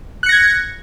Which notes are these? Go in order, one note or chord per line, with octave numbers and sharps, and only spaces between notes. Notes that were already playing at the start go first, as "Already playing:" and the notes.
F#6 G#6 A#6 C#7